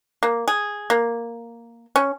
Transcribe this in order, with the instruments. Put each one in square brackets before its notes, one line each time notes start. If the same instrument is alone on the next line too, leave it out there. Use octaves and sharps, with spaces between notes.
[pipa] A#3
G#4
A#3
C#4